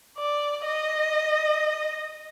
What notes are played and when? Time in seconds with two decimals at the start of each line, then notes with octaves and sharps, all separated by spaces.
0.18 D5
0.67 D#5